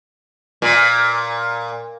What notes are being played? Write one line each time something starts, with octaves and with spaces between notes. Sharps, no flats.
A#2